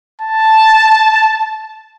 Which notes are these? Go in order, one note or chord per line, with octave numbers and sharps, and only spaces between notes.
A5